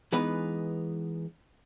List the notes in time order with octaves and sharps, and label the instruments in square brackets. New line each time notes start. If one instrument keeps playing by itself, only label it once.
[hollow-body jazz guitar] E3 G#3 B3 D#4 B4